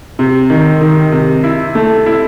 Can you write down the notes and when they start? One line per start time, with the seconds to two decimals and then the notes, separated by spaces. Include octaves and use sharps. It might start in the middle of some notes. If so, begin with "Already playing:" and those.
0.19 C3
0.50 D#3
0.81 D#3
1.12 C3
1.43 E4
1.75 A3
2.06 E4